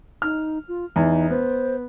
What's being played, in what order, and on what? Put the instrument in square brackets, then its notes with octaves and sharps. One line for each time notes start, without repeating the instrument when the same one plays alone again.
[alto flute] D#4 [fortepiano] F6
[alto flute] F4
[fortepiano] E2 [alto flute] D#4
[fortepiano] B3 [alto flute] C5